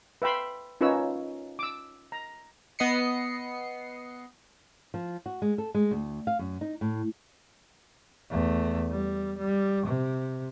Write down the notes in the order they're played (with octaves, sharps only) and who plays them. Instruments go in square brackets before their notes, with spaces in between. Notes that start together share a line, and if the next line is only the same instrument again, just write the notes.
[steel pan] B4 E5 G5 B5 C6
C#4 D#4 F4 B4 C#5 E6
D6 E6
A#5
[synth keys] B3 D#5 C7 C#7
[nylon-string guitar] F3
F#4
G#3
A4
G#3
D2
F5
F#2
D#4
A2
[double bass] E2 A3
G3
G3
C3